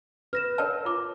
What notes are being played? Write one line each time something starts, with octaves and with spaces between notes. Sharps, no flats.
B4 F6 A#6 E7
A#4 C#5 A5 F6
F4 D6